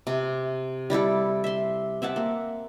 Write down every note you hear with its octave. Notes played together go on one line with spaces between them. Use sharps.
C3
G3 E4 G4 A4
E5 C6
C4 E5 F#5 A5
A#3